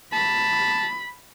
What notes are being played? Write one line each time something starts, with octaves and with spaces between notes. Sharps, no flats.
A5 B5